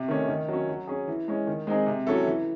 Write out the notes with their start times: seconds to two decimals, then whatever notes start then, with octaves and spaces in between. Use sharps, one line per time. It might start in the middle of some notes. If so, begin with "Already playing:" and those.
Already playing: C3
0.08 D#3 A3 C#4
0.28 D#3
0.48 F#3 C#4
0.69 F#3
0.87 C#4 G#4
1.08 E3
1.28 G#3 C#4
1.47 D#3
1.67 G#3 C4 D#4 G#4
1.86 C3
2.07 F#3 C#4 E4 A4
2.27 E3